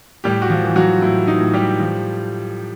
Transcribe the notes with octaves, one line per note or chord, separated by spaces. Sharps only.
A2 G3 G4
F#4
F3 F4
E3
F#3 F#4
A2 E4
D#4
A2
G3 G4
F3